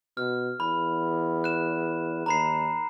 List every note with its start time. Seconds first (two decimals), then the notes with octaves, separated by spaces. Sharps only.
0.17 B2 F6
0.60 E2 B5
1.44 F#6 E7
2.26 D#2 A#5 B5 C7